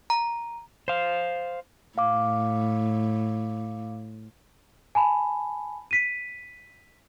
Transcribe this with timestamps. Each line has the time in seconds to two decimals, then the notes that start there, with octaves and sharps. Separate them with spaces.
0.10 A#5
0.88 C5 F5
1.98 A2 F5 D6
4.95 G#5 A5 B5
5.91 B6 D#7